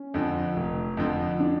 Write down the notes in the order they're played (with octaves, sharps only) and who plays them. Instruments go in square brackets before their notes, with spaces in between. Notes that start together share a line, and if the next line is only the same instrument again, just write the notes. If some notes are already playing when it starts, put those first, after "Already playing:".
Already playing: [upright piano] C#4
[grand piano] F2 D3 F3
F1
F2 D3 F3
[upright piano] D4